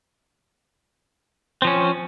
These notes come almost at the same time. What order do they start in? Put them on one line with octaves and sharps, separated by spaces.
C4 F3 C#4